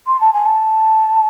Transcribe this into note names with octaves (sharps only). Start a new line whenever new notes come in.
C6
A5
G#5
A5